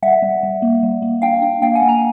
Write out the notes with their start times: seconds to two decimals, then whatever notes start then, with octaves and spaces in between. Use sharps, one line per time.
0.03 G3 E5 F#5
0.22 G3
0.43 G3
0.62 A#3
0.83 G3
1.02 A#3
1.22 D4 F5 G5
1.42 D4
1.62 A#3 F5 G5
1.75 F#5 G#5
1.82 A#3
1.89 G#5 A#5